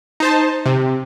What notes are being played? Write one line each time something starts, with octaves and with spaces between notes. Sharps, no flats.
D#4 C5 A5
C3